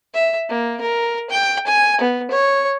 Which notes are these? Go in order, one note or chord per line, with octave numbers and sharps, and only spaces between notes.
E5
A#3
A#4
G5
G#5
B3
C#5